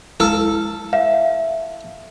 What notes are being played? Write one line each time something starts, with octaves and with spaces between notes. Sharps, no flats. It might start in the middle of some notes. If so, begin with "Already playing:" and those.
G#3 E4 A4
E5 F5